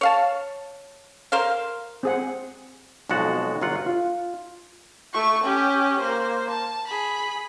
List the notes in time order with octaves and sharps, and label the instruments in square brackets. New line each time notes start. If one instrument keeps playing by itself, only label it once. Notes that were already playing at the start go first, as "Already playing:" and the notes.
[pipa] C#5 F5 A5
A#4 C5 F5
[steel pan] C4 G#4 F#5
[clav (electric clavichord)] B1 F2 G#3 F#4 F#5 A5
G1 F#3 F4 F#5
F4
[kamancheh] A3 C#6
C#4 G4
A#3 C5
A5
G#4 B5